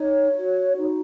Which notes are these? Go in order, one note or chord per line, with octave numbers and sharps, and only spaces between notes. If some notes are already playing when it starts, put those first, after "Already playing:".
Already playing: D#4 C#5
F#4
D#4